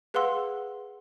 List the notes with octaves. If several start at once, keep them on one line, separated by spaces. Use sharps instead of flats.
G#4 B4 F5 F#5 C6 E6